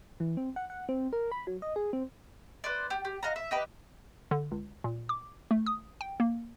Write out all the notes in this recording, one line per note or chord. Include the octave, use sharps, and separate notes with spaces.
E3
C4
F#5
F#5
C4
A#4
B5
F#3
D#5
G#4
C4
B4 C5 D5
G4
G4
D#5 F5 F#5 A#5
E5
D#4 G4 B4
D3
C#2
A#2
D6
A3
D#6
G5
A#3